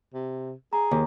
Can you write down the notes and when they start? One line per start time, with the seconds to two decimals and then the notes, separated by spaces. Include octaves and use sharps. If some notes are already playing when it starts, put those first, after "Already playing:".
0.14 C3
0.73 G#4 A#5
0.91 D#2